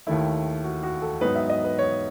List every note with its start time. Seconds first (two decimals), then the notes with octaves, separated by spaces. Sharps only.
0.07 D#2 D#3 A3 E4
0.64 F#4
0.83 F#4
1.02 A4
1.21 G#2 F#3 B3 D#4 B4
1.35 E5
1.50 D#5
1.64 B4
1.79 C#5